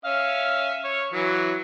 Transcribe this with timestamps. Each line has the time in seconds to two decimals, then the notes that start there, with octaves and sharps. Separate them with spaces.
0.05 C#4 E5 F5
0.84 C#5
1.13 E3 F#3